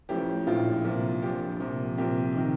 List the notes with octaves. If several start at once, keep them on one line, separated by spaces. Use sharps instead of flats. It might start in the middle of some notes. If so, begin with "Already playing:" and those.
A1 A2 F3 G4
A#1 A2 F3 F4
C2 A#2 F3
A#1 A#2 F3 G4
C2 A#2 F3
C2 A#2 F3 G4
C3 D#3